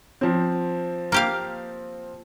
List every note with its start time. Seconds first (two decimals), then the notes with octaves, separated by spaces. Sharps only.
0.21 F3 C4
1.12 A#3 G4 F5